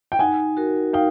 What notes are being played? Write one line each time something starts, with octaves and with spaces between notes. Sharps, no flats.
G5
D#4 F#5 G#5
F#4 A#4
D#4 F5 G5